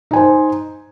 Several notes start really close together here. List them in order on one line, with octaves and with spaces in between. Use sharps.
D#4 G#5 C5